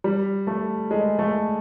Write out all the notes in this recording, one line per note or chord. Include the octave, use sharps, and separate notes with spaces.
G3
A3
G#3
A3